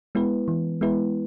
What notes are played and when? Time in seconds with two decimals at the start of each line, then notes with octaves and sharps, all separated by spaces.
0.15 G#3 B3 E4 B4
0.48 E3
0.81 G#3 B3 E4 B4